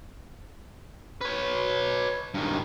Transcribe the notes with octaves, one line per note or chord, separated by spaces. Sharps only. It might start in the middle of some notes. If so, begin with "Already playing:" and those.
B4 C#5
G2 D#3